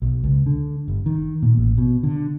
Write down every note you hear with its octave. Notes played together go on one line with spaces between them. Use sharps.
B1
C#2
D3
G1
D#3
A#2
A1
B2
D3